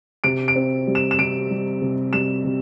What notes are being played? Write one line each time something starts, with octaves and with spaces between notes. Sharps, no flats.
C3 D7
D7
C4
G3
E7
E7
C3 D7
G3
C3
G3 E7
C3